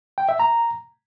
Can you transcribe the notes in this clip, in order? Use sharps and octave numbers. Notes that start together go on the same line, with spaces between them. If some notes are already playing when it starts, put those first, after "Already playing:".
G5
E5
A#5